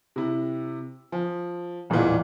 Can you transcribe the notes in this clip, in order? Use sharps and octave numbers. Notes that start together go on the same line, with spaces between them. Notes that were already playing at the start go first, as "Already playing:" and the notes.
C3 E4
F3
D#1 A1 E2 A#2 E3 F4